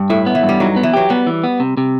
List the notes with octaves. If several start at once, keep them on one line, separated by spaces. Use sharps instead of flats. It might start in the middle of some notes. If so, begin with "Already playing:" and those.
Already playing: G2
A2 E4
B3
E3
G2
G3
F#3 D#4
B3
E3
F#3 G4
G3 B3
E3
B3
C3
C3